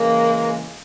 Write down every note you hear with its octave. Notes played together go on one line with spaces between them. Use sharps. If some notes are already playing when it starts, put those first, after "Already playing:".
Already playing: C#3 E3 G#3 A#3